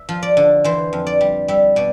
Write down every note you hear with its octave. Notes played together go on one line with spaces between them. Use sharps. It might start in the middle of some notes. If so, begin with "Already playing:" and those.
Already playing: E5
F3
D5
D3
E3 C5
F2
D5
G3
G3 E5
B2 D5